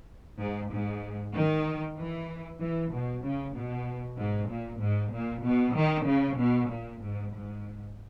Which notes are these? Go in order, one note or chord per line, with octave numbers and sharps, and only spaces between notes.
G#2
G#2
D#3
E3
E3
B2
C#3
B2
G#2
A#2
G#2
A#2
B2
D#3
C#3
B2
A#2
G#2
G#2